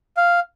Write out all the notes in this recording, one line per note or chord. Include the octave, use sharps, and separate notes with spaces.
F5